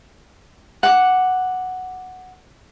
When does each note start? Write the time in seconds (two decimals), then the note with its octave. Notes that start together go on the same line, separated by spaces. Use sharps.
0.83 F#5 D6